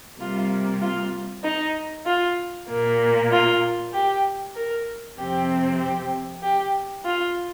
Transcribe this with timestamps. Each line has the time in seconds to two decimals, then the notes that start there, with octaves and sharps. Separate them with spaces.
0.19 C3 G3 A#3 F4
0.81 F4
1.44 D#4
2.06 F4
2.68 A#2 A#3
3.32 F4
3.94 G4
4.55 A#4
5.18 F2 C3 F3 C4 G4
5.80 G4
6.43 G4
7.05 F4